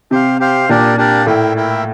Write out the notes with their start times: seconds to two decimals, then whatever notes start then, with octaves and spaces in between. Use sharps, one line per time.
0.11 C3 G4 C5 F5
0.40 G4 C5 F5
0.69 A#2 D4 G4 A#4 D5
0.97 D4 G4 A#4 D5
1.26 A2 E4 A#4 E5 G5
1.55 E4 A#4 E5 G5